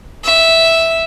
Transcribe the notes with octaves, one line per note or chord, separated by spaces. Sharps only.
E5